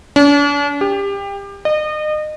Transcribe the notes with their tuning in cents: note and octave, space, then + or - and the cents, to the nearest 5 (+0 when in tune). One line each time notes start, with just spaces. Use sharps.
D4 -45
G4 +25
D#5 -30